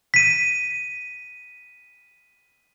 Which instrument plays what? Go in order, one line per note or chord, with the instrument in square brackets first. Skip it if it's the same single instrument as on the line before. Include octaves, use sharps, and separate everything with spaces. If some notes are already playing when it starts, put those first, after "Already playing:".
[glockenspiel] B6 D#7